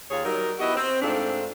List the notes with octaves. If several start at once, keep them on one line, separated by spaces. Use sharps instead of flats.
D#2 F4 G#4 C#5
F#3 G3 D#4 A#4
B3 E4 F#4 G4 D#5
C4
G#2 A3 C4 D4 F4